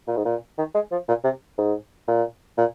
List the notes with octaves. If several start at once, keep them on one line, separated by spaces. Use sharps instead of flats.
A#2
G#2
A#2
D#3
G#3
F3
A#2
C3
G#2
A#2
A#2